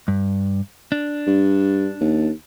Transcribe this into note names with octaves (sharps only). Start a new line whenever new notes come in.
G2
D4
G2
D#2